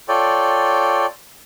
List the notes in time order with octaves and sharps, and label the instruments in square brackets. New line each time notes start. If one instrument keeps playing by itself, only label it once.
[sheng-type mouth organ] F4 A4 C#5 D5 G5